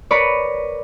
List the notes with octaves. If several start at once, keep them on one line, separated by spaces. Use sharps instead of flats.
A#4 B4 C#5 D5